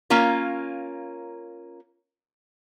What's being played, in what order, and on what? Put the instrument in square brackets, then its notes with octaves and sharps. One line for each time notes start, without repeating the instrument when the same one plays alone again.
[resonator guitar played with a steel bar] A#3 C#4 F4 A#4